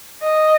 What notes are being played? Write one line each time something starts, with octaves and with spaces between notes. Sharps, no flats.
D#5